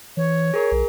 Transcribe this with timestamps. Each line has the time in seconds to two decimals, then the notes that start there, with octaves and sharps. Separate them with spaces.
0.17 E3 C#5
0.54 G#4 A#4
0.72 B1